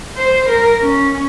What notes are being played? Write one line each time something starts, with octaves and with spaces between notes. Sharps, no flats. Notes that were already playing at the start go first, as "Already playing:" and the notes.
C5
A#4
C#4